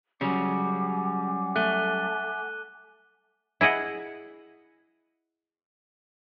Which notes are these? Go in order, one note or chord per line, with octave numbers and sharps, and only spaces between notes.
C#3 F#3 G3 C#4 F#5 G#5 D6
A3 F#6 D#7 G7
E4 G#4 D#5 F#5